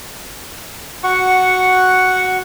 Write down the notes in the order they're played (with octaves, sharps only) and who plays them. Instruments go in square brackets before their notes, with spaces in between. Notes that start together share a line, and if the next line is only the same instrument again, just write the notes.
[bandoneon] F#4 C#6 [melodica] F#5